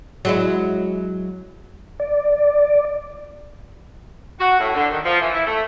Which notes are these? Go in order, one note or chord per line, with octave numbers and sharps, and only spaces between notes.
F#3 G#3 E4
D5
F#4
A2
D3
D#3
F3
E3
E4
A3